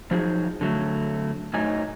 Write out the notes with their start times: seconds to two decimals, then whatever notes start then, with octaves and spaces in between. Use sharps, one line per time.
0.11 F3 F#3 D#4 G#4
0.61 D3 F#3 A3
1.53 F#2 A2 F#3 D#4 G#5